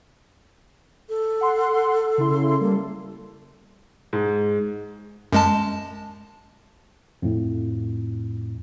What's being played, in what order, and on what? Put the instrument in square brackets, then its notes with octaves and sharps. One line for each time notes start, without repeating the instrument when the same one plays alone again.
[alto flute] A4
[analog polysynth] F#5 C6
C#3 E4 C6
[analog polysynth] G3 A4 [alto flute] A#3
[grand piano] G#2
[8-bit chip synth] F#2 G#3 A5
[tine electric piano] F2 A2